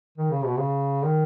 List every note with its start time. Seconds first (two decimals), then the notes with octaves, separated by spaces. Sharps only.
0.18 D#3
0.31 C#3
0.44 B2
0.58 C#3
1.05 D#3